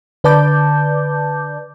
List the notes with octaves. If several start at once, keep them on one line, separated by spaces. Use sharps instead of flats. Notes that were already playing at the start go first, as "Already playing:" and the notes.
D3 B4 D5 A5 D6 G6